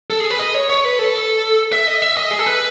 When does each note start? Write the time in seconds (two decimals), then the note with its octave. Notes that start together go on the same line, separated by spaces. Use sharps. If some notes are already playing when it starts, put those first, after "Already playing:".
0.10 A4
0.20 G#4
0.30 B4
0.39 D#5
0.54 C#5
0.70 C#5
0.84 B4
0.99 A4
1.73 E5
1.87 D#5
2.02 E5
2.17 D#5
2.31 G#4
2.39 A4
2.46 B4